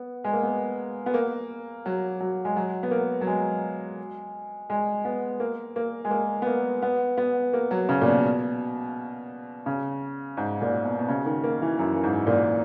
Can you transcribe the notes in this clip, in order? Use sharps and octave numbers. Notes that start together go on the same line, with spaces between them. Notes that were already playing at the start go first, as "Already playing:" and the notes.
Already playing: B3
G#3
A#3
B3
B3
A#3
F#3
F#3
G#3
F#3
B3
A#3
F#3
G#3
G#3
B3
A#3
A#3
G#3
A#3
B3
A#3
B3
B3
A#3
F#3
C#3
A#2
B2
C#3
G#2
A#2
B2
B2
C#3
D#3
A#3
E3
F#2
G#2
A#2